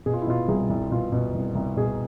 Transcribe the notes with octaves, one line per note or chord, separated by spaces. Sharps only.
B2 G#4
F4
E4
B2 F4
C2 G#4
C2
B2 F4
B2
C2
C2
B2 G#4